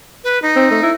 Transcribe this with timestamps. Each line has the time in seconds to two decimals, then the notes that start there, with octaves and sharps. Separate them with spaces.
0.24 B4
0.42 D#4
0.56 C4
0.71 A3
0.82 E4